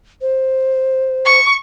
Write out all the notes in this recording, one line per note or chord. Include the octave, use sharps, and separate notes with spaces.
C5
C#6